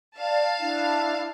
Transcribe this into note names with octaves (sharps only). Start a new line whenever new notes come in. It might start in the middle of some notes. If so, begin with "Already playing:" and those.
D5 F5 A5
D4 E4